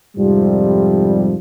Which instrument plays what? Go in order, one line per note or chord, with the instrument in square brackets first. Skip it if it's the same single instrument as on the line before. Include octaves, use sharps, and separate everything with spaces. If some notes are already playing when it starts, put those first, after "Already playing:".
[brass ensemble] F2 G#2 C3 F3 G3